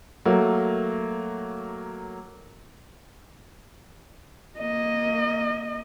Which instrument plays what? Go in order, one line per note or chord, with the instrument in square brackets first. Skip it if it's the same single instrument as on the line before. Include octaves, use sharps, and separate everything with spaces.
[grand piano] F#3 A3 A#3
[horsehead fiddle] A#3 D#5